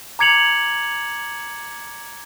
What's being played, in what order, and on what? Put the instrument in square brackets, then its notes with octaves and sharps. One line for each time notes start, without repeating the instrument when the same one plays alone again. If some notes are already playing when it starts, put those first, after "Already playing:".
[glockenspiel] A#5 D6 G#6 C#7 F7 F#7